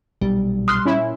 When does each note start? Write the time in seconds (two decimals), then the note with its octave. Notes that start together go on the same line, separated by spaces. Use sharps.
0.21 B1 A#2 G3
0.68 C6 D#6 F6 F#6
0.85 A#2 C#4 E4